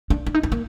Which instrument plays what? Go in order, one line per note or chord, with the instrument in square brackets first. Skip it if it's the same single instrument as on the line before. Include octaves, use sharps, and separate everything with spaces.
[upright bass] D4
D4
D#4
D4
A#3